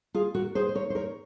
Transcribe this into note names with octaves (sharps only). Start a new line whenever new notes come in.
F4 G#4
F#4 A#4
G#4 C5
C5
A#4 C#5
C5
A#4 C#5